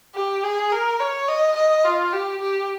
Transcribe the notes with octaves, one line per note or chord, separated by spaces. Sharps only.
G4
G#4
A#4
C#5
D#5
D#5
F4
G4
G4